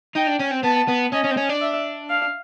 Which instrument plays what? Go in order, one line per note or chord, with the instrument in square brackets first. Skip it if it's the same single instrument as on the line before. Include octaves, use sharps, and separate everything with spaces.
[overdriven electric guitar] D#4 [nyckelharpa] G5
[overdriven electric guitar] D4
C#4
C4
[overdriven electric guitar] B3 [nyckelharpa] A5
[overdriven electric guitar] B3
[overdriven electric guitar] C#4 [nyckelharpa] D#5
[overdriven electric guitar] C#4
C4
C#4
D4
[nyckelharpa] E5
F5